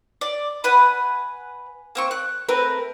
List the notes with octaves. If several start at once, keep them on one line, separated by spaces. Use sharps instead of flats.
D5
B4 F#5 G#5
A#3 C4 C#6
F#6
A3 C4 A#4 B4